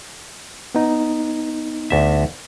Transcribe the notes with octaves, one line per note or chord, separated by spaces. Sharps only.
B3 D#4
D2 E5